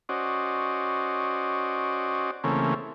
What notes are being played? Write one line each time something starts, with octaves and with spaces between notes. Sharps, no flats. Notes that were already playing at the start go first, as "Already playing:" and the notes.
C#4 F#4 C5 D5 D#5
C#3 E3 A3 A#3 C4 C#4